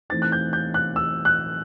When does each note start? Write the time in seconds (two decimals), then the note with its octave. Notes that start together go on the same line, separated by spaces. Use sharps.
0.10 E3 A3 C4 D#4 A6
0.22 F#6
0.32 G6
0.53 G6
0.74 F#6
0.96 E6
1.25 F#6